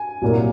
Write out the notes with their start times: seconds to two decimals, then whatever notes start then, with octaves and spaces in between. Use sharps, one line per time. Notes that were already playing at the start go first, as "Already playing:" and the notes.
Already playing: G#5
0.22 C2 A#2 F#3 A#3